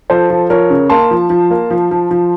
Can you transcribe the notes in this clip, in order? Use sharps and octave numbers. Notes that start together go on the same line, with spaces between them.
F3 A4 C5
F3
F3 A#4 C#5
C#3
A#3 A5 C6
F3
F3
A#3
F3
F3
F3